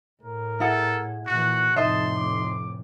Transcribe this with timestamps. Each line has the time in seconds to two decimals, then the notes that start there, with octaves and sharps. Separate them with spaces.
0.23 A2 A#4
0.60 E4 G#4 A4 F#5
1.27 A#2 E3 F#4 F#6
1.76 F1 A2 D#4 D#5 E5 A5 C6
2.16 D6